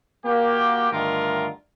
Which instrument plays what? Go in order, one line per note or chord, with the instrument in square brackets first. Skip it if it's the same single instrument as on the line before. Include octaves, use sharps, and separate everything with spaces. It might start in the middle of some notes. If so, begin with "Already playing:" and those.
[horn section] A#3 F#4 G4
G2 D3 D#3 A3 F4 A#4